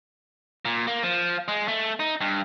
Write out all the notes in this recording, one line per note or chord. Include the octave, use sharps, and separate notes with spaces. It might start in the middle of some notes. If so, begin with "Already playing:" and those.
A#2
A#3
F3
G#3
A3
D#4
G2